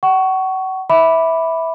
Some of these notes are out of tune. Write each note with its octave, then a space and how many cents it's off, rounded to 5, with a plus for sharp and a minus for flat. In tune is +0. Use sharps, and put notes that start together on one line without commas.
F#5 +35 C#6 +5
E5 -15 B5 +0 D6 +0